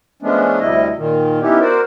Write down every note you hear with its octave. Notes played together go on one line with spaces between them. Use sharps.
F3 G#3 A3 B3 C#4 D4
D2 C3 G3 E4 D#5
A#2 D#3
B3 C#4 D#4 E4 G4
F#4 A#4 C5 D5